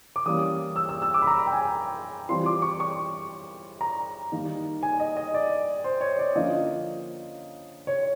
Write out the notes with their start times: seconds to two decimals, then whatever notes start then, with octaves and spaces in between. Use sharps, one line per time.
0.16 D6
0.26 E3 G3 A#3 C#4 D#6
0.76 E6
0.89 E6
1.02 E6
1.14 D6
1.22 B5
1.27 A#5
1.47 G5
1.53 G#5
2.29 E3 G3 C4 F4 C6
2.46 D6
2.62 C#6
2.80 C#6
3.81 A#5
4.32 D#3 G3 A#3 D#4
4.83 G#5
5.00 D#5
5.17 D#5
5.34 D5
5.84 C5
6.01 C#5
6.19 D5
6.35 D3 F3 A#3 C#4 D#5
7.87 C#5